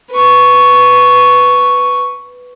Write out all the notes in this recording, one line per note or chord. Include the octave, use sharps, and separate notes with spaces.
B4 C#6